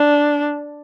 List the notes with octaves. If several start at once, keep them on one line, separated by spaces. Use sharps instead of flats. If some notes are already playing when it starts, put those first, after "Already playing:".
Already playing: D4